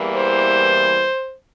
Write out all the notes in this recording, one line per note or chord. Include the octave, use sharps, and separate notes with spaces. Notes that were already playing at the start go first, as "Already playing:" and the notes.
Already playing: E2 E3 G3 A#3
C5